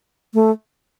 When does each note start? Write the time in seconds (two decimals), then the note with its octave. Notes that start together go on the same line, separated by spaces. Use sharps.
0.34 A3